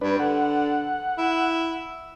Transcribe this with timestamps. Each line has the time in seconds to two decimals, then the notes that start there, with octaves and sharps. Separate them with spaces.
0.01 G2 D4 B4
0.19 D3 F#5
1.18 E4